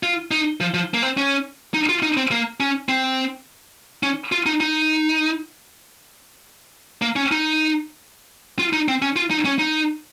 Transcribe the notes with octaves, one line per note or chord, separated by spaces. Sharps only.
F4
D#4
F3
F3
A#3
C4
C#4
D#4
F4
D#4
C4
A#3
C#4
C4
C#4
F4
D#4
D#4
A#3
C#4
D#4
F4
D#4
C4
C#4
F4
D#4
C#4
D#4